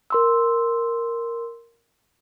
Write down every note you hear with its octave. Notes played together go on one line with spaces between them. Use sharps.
A#4 C6 E6